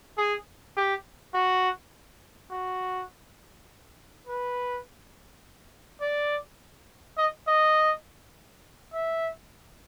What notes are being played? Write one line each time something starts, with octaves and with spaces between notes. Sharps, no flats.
G#4
G4
F#4
F#4
B4
D5
D#5
D#5
E5